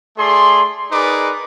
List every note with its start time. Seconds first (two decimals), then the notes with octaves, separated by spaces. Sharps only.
0.18 A3 G#4 D5 C6
0.91 D#4 G#4 A#4 B4 D5 D6